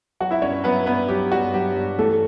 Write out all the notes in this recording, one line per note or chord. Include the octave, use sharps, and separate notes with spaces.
F#3 F#4 F#5
E4 E5
G2 C#4 C#5
F#3 B3 B4
G2 B3 B4
F#3 G4
G2 F#4
F#3 G4
G2
E3 A3 A4